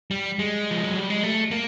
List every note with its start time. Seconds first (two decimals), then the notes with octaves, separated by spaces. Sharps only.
0.11 G3
0.39 G#3
0.71 F3
0.84 F#3
0.96 G3
1.10 G#3
1.23 A3
1.51 A#3